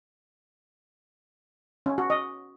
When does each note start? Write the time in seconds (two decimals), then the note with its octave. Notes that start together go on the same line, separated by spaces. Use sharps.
1.86 C#4
1.98 F#4
2.10 D#5